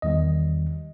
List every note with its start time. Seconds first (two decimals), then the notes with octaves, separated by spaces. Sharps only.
0.02 E2 D#3 G3 D#5